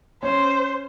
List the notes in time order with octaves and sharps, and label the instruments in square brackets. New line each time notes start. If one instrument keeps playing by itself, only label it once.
[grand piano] C#4 [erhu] C5